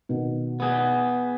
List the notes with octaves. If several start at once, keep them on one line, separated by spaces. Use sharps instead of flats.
B2 D#3
B3 G#4